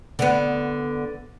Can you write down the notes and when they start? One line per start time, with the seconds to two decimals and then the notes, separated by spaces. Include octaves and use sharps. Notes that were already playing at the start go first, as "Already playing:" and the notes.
0.19 D3 B3